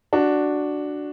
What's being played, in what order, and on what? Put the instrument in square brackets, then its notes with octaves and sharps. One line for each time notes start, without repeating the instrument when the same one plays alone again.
[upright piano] D4 F#4